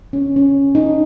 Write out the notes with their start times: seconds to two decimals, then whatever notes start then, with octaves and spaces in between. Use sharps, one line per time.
0.13 C#4
0.36 C#4
0.75 D#4